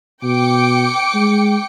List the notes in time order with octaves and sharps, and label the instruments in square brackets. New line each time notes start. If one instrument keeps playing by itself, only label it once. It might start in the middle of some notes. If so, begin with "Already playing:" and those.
[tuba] B2 [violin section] G5 D6 C#7
[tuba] G#3